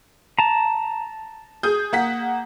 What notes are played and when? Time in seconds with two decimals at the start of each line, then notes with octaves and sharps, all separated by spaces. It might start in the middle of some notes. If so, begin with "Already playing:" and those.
0.39 A5 A#5
1.63 G#4 D#6 G6
1.93 A#3 F#5 B6